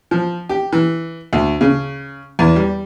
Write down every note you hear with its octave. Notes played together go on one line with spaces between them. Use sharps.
F3
G4
E3
D2
C#3
E2
G3